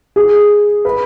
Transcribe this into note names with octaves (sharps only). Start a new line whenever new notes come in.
G#4
B4